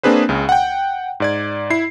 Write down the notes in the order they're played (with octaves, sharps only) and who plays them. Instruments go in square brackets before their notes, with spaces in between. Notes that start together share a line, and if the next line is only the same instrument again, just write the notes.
[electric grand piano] A#3 C4 D4 G#4 B4 C5
C#2 C#3
F#5 G5
G#2 D5 G#6
E4 C7